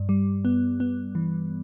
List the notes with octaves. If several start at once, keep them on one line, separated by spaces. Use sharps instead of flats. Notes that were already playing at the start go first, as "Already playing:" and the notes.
Already playing: G2
G3
B3
B3
E3